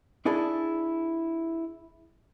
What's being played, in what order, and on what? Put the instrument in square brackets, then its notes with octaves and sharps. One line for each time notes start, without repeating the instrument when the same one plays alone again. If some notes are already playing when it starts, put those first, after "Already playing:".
[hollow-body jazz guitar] D4 E4 G#4 A4